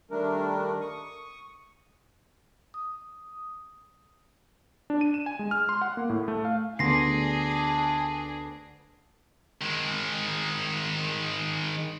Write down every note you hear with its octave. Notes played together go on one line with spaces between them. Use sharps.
D#3 G3 A3 D4 A#4
C#6 D#6
D#6
D4
D#7
E7
G#5
G#3
F6
C6
F#5
A#3
A2
A3
F5
D2 B3 D4 G#4 C6 A#6 C7
D#3 G#3